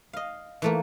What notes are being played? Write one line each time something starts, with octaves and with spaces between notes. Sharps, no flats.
D#5 F5
E3 A3 A#3